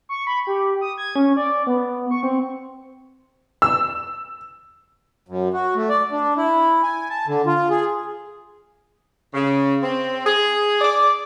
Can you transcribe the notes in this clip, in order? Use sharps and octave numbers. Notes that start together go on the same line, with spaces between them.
C#6
B5
G4
D#6
G#6
C#4
D5
B3
C#6
C4
E6
F#2
F#4
A3
D5
D4
E4
G#5
A5
D3
F4
G#4
C#3
C4
G#4
D5